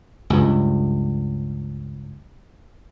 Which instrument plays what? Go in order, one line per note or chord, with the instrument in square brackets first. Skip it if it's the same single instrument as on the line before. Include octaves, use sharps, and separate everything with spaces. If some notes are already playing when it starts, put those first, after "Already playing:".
[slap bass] C#2 G2